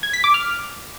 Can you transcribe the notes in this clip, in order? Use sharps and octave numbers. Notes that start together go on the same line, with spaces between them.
G#6
B6
D6
F6